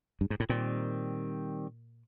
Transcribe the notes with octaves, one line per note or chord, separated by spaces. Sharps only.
G2
G#2
A2
A#2 D#3 G3 C4